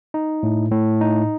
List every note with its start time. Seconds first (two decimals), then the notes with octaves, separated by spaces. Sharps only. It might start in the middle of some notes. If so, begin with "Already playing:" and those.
0.14 D#4
0.43 A2
0.71 A2
1.01 D#4